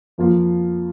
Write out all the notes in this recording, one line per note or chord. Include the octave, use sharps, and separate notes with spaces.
F2 F3 A#3 F4